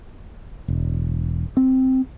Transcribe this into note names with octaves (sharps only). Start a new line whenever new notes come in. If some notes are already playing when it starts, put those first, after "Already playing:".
E1
C4